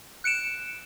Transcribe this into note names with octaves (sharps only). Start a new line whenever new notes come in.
F#6 C#7 D7 E7